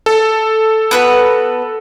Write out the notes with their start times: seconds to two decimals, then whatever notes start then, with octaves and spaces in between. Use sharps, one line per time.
0.06 A4
0.91 B3 F#4 B4